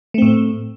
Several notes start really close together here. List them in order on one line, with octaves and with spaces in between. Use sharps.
A3 C4 A2